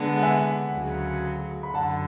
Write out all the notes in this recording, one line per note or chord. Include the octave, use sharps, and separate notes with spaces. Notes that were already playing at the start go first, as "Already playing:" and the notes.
Already playing: D3 G#3 B3 D4
F#5
E5 G#5
D2 C#3 F#3
B5
F#2 D3 F#5 A5